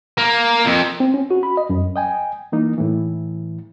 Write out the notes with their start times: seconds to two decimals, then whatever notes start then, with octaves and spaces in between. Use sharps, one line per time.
0.18 A#3
0.65 F2
1.00 C4
1.14 C#4
1.31 F#4
1.43 B5
1.57 D#5
1.70 F#2
1.96 D#5 G5 G#5
2.52 E3 A#3 D#4
2.78 A2 E3